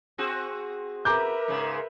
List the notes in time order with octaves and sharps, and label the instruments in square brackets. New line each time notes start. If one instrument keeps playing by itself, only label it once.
[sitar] C4 F#4 G#4
[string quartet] A#4 B4 E5 [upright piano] A#5 D6 G6
[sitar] G#2 C#3